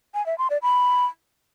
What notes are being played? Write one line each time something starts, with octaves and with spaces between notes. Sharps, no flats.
G#5
E5
C6
D5
B5